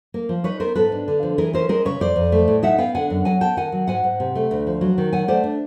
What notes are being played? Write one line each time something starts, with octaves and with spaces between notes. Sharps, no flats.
A#3
F3
D#4 B4 C#5
B3 A#4 C5
G#2 A4 B4
D4
D3
F3
E3 G#4 A#4
C#4 A#4 C5
G#3 A#4 C5
C#3 B4 C#5
F2 C5 D5
F2
A3
A2
D#4 E5 F#5
B3 F5 G5
D3 F#5 G#5
F#2
F#3 F#5 G#5
B3 G5 A5
D#3 F#5 G#5
F#3
G#2 F#5 G#5
G#2
C3
A3
D2
F3
F#3
D#3
F#3 F#5 G#5
A3 C5 D5
D4